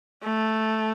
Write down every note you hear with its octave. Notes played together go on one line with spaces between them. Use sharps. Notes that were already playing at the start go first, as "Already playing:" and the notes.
A3